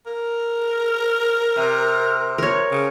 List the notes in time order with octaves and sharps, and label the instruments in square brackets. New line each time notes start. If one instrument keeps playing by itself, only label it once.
[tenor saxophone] A#4
[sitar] C3
[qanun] A#4 C#5
[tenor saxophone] C#3